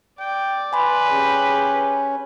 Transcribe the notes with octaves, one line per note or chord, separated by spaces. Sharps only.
D5 G5
B4 G#5 B5 C6
C#4 G4 G#4